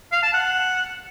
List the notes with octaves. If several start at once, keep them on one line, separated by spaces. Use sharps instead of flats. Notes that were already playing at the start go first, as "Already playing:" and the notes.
F5
A5
F#5